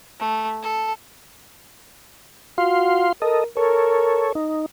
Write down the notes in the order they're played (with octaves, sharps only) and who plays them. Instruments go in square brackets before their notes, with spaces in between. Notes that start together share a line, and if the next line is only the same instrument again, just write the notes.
[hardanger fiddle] A3
A4
[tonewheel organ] F4 F5 C6 [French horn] F#4
[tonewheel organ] A4 D#5 [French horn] A#4
[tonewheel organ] A4 C#5 [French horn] A#4
[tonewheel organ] D#4